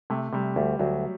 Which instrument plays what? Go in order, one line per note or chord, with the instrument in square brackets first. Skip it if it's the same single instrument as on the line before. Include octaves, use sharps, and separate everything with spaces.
[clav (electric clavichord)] C3 [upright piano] A3
[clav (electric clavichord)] C3 [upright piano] G3
[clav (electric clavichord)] D2 [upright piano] G3
[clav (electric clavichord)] D2 [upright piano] F#3